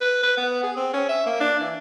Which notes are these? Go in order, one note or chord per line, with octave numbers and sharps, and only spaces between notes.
B4
B4
B3
G#4
C4
C#4
E5
A#3
D4
E3